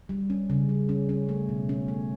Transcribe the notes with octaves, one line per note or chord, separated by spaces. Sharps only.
G3
C#4
C#3
G3
C#4
C#4
A3
B2
C#4
A3